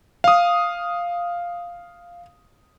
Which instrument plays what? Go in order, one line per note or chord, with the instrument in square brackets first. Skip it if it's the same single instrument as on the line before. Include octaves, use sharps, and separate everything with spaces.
[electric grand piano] F5 D#6